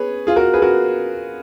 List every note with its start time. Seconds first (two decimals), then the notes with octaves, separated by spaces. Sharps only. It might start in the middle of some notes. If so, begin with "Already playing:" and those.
Already playing: G#4 B4 C#5
0.27 F4 G#4
0.36 F#4 A#4
0.54 G#4 B4
0.62 F#4 A#4